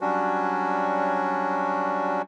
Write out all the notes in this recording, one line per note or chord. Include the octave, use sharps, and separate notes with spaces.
F#3 G3 C#4 D4 F#4